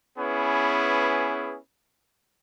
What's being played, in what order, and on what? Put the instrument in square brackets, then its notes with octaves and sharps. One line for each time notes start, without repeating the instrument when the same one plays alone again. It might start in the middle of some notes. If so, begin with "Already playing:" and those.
[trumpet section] B3 C#4 E4 G#4 B4